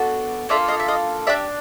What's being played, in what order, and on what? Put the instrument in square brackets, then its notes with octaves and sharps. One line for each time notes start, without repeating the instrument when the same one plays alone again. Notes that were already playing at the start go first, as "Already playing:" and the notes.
Already playing: [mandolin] B3 D4 F#4 A4
A#3 D4 F4 A4 D5 E5
D#5 F5
E5
D#5 F5
D4 G4 D5 E5